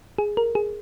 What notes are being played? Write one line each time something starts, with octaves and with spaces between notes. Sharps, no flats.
G#4
A#4
G#4